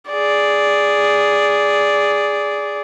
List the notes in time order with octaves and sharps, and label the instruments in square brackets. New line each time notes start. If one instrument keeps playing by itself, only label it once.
[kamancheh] G#4 D5